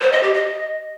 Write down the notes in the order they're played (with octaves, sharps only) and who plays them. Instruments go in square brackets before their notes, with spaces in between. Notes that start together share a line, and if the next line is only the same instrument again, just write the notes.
[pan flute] C5
D#5
G4
D#5